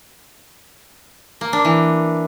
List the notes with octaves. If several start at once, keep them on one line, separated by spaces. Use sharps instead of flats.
A#3
D4
E3